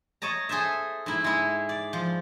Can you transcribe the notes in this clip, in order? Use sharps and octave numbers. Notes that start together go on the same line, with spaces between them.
C#5 D#5 A5 A#5
G#4 A4 C5 E5
G#2 E4
G#3 E4
D5
F3